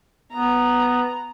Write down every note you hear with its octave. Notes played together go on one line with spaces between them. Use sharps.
B3 A#5